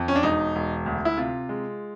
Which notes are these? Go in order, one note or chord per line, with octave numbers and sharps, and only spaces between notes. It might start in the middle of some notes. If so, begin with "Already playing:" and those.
Already playing: F2
C#4
D4
E1 D#4
E1
D2
E4
C3 F4
G#3